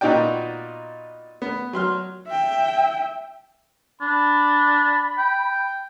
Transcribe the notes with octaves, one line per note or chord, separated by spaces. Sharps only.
A#2 B3 D#4 F#4 D5 G5
B3
F#3 C6 F6
E5 G5
D4 B5
G5